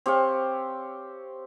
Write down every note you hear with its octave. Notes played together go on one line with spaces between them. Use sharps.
C4 G4 C#5 F5